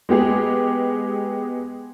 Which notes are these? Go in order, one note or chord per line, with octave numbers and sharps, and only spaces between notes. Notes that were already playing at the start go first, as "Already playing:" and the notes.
G#3 B3 G4 G#4